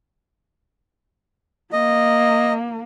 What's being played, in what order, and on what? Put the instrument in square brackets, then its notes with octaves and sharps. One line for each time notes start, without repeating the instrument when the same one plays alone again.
[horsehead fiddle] A#3 [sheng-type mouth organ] D#5